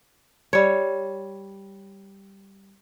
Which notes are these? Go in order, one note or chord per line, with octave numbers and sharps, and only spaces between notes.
G3 C#5